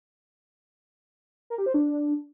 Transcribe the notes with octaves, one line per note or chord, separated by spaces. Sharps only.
A#4
G4
C5
D4